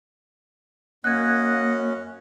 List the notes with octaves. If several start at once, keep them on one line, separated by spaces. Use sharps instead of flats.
F#2 A#3 C#4 D#5 F#5 F#6 G#6